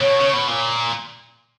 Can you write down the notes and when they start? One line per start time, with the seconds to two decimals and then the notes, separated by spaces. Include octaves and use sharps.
0.01 B2 C#5
0.20 C#3
0.34 B2
0.48 A#2